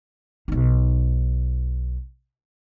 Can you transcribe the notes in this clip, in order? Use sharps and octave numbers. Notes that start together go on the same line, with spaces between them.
B1 D#4